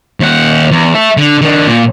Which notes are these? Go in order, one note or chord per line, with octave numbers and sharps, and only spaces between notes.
D#2 F#5
E2
E5 A5
D3
D#3 D4
A#2